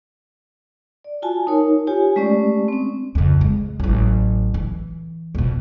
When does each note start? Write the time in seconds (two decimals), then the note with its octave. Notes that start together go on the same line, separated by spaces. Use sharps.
1.04 D5
1.22 F4 F#4 G#5 A5
1.47 D#4 A#4 C#5
1.87 F4 G4 C#5 G#5
2.16 G#3 A3 C#4 G4 D5
2.68 C4 C#4
3.15 F2 C#3
3.41 G#3
3.80 A1 F#3
4.54 E3
5.35 F2 B2